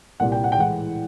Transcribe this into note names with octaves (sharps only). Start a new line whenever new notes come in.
C2 A#2 G3 F#5
G5
F#5
G5
A2 E3 G#3 F#5